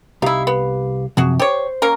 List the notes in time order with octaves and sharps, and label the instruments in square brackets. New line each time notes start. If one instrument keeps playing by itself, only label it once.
[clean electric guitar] C2 G4 F5 [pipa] D#4 E4
[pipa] B3
[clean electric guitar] F#2 C3 F3 [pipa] F#4 G#4
[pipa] G4 C#5 [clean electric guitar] C5
[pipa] A#3 C#4 A#4